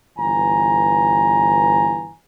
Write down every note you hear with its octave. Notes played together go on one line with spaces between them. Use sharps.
G1 E3 G#5 A#5